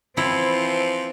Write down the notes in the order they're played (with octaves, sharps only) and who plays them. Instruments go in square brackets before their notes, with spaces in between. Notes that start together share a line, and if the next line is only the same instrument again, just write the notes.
[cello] E3 C4 [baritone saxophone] F3 [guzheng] E4